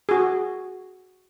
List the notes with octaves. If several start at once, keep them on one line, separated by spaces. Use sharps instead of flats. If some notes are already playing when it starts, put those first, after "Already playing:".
F#4 G#4